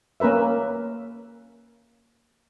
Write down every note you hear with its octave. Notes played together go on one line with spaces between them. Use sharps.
A#3 C#4 A#4 B4 E5